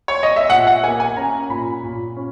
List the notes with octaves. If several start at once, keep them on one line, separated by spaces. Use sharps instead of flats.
C#5
D#5
E5
A#2 F#5
F#5
A#3 G#5
G#5
C#4 A#5
A#2 B5
A#2
C#4